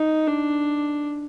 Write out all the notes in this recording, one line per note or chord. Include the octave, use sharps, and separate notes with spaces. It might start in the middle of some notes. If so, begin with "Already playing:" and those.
Already playing: D#4
D4